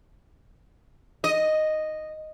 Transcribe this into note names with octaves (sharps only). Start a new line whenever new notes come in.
D#5